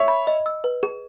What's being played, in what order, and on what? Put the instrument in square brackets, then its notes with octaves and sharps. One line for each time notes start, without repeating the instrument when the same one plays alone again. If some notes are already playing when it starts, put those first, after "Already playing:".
Already playing: [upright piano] C#5 E5
[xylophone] B5
D#5
E6
B4
G#4